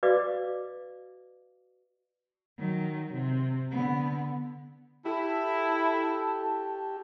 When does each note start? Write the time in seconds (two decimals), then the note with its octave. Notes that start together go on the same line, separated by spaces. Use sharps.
0.03 F#4 B4 D5 D#5 F5 D6
2.59 D#3 F#3
3.14 C3
3.71 D3 B3
5.05 E4 G4 A4 A5